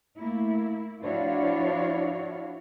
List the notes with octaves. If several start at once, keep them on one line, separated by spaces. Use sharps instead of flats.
A3 A#3 E4
F3 D4 E4 F#4 C#5 F5